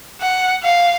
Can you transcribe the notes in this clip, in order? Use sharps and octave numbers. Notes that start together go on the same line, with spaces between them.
F#5
F5